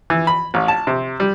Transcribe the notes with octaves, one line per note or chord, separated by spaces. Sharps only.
E3
B5
A1
A5
C3
G3